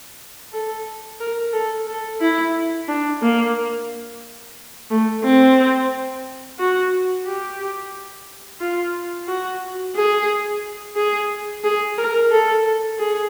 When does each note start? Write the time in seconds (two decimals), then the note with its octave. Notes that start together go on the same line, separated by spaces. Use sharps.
0.52 A4
1.20 A#4
1.53 A4
1.87 A4
2.21 E4
2.88 D4
3.22 A#3
4.90 A3
5.24 C4
6.59 F#4
7.26 G4
8.60 F4
9.28 F#4
9.96 G#4
10.96 G#4
11.64 G#4
11.98 A#4
12.31 A4
12.99 G#4